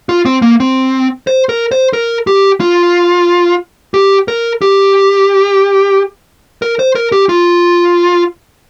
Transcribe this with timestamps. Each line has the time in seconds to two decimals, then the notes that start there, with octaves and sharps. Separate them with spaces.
0.09 F4
0.25 C4
0.42 A#3
0.60 C4
1.27 C5
1.49 A#4
1.72 C5
1.93 A#4
2.27 G4
2.60 F4
3.94 G4
4.28 A#4
4.62 G4
6.62 A#4
6.79 C5
6.95 A#4
7.12 G4
7.29 F4